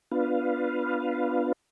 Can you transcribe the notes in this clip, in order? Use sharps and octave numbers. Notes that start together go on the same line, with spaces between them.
B3 D4 F4 B4 F5